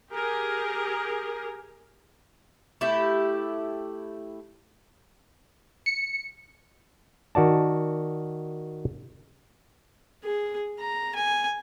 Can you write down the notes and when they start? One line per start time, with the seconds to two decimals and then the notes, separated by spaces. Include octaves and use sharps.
0.10 G4 G#4 A#4
2.81 A3 E4 G4
5.86 C#7
7.35 D#3 F#4 D5 A5
10.24 G#4
10.80 A#5
11.15 G#5